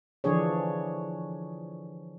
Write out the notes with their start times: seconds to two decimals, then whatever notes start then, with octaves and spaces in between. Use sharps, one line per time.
0.24 D3 E3 F3 D4 G#4 C#5